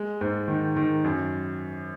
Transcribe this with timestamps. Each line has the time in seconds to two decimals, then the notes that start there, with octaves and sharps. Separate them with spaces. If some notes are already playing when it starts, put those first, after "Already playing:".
Already playing: G#3
0.21 G#2
0.48 D#3
0.76 D#3
1.04 F#2